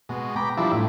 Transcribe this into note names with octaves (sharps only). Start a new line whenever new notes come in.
B2 G#3
G5 A#5 B5 D6
F3 G3 D4 E4
A2